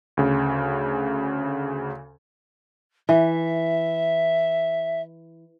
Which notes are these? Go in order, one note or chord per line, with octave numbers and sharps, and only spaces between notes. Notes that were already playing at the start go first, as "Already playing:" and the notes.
D2 C#3
E3 E5